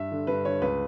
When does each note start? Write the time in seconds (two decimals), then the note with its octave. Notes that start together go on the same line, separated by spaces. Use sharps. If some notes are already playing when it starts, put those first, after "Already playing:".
Already playing: G2 E5
0.11 D3
0.27 G2 B4
0.45 D3 C#5
0.62 C#2 B4